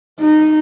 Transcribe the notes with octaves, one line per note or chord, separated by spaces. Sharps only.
D#4